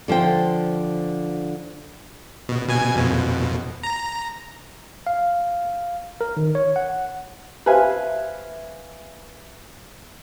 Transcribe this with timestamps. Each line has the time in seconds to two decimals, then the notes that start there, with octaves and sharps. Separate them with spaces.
0.08 D3 F3 C5 G5
2.49 B2
2.69 B2 G#5
2.96 F2 B2
3.83 A#5
5.07 F5
6.21 A#4
6.37 D#3
6.55 C#5
6.76 F#5
7.66 B4 C5 E5 F5 G#5